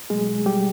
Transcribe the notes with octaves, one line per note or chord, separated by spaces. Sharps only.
B2 F#3 G#3 A3 G#4
G3 G4